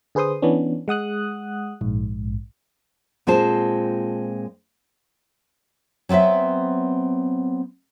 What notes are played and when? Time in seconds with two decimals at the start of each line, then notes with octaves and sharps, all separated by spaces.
0.15 D3 G#4 B4 C5 C6 D#6
0.42 E3 B3 C#4 D4
0.88 G#3 F#5 D#6 F#6
1.81 A#1 G#2
3.27 A#2 G#3 C4 F4 C5 A5
6.09 F#3 B3 C4 B4 E5